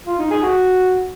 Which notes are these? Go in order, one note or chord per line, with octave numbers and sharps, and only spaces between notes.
F4
D#4
G#4
F#4